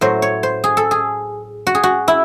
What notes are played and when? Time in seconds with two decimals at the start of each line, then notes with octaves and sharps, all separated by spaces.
0.01 A2 F#3 C5
0.22 C#5
0.43 C5
0.64 G#4
0.77 A4
0.91 G#4
1.67 F#4
1.75 G#4
1.83 F#4
2.08 E4